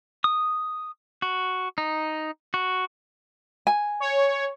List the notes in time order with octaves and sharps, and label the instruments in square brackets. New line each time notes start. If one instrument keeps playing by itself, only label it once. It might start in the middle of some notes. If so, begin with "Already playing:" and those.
[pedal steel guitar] D#6
F#4
D#4
F#4
[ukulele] G#5
[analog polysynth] C#5